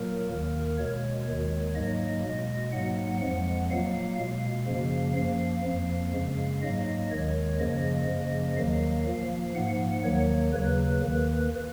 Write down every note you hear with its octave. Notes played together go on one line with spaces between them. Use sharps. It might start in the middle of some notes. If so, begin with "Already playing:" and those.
Already playing: A#2 F#3 A#3 A#4
D#2 D#3 A#3
B2 G#3 C#5
D#2 D#3 G#3
G#2 F#3 A#3 D#5
B2 G#3
G#2 F#3 A#3 F#5
F2 F3 G#3 F#5
A#2 F#3 A#3 F5
B2 G#3 F5
F#2 C#3 F3 A#3
F#2 F3 A#3 F5
F2 F3 A#3
F#2 C#3 G#3
G#2 F#3 A#3 D#5
D#2 D#3 G#3 C#5
F#2 C#3 F3 A#3 D#5
F#2 C#3 F3 A#3
D#2 D#3 F#3 A#3 F5
A#2 F3 A#3 F5
G#2 F3 A#3 F#5
D#2 D#3 F#3 A#3 C#5
D#2 C#3 F#3 A#3 B4
D#2 D#3 A#3